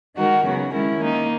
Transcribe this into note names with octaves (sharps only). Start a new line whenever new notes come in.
D#3 G#3 D#4 F#4 A#4
F#2 C#3 F#3 B3 F#4
D#3 G#3 C#4 E4 A#4
D#3 A#3 D#4